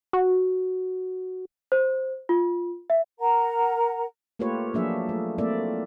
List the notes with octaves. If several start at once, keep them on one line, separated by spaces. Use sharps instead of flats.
F#4
C5
F4
E5
A#4 F#5 A#5
A3 A#3 F4 G4 B4 C#5
F3 F#3 A#3 D4 G#4 E5
A3
A3 A#3 C4 E4 D5 E5